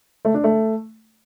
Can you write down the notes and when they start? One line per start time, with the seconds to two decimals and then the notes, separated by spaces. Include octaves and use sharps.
0.25 A3
0.34 D4
0.44 A3